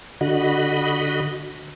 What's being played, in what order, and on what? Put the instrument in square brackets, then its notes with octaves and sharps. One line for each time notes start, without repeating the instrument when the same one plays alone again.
[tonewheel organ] D3 F#4 D#5 B5